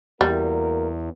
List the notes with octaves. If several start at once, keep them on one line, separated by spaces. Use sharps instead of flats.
E2 G3 A#3 F#4 A#4